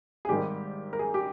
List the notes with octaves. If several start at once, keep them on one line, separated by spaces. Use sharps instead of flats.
G#4
G#1 G#2 D#3 G3 G4
A#4
G#4
G4